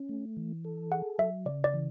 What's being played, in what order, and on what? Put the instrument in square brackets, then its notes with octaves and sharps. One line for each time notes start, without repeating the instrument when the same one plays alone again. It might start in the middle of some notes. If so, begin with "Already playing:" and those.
Already playing: [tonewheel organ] C#4
A3
E3
A4
[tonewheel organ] G#4 [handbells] F#5
[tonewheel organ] F#3 [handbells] E5
[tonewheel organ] C#3 [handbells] D5
[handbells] D5
[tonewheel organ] E3